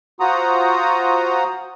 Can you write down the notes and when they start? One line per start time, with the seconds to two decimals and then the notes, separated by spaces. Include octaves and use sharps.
0.20 F4 F#4 C5 F#5 A#5 D#6